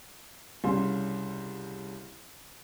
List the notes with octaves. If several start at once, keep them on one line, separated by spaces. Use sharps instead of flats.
C2 C#3 C6